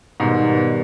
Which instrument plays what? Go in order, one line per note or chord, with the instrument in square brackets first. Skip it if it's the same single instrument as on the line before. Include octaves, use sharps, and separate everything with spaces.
[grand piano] G#2 B2 [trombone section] D#3 G3 B3